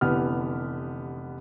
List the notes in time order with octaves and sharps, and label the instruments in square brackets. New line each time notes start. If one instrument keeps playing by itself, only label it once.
[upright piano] F1 D3 E3 B3 G4 F6